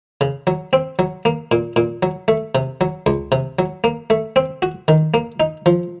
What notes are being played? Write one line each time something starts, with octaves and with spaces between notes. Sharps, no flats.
C#3
F#3
C4
F#3
A#3
A#2
A#2
F#3
A3
C3
F#3
C#2
C3
F#3
A#3
A3
C4
F#4
D#3
A#3
D#4
F3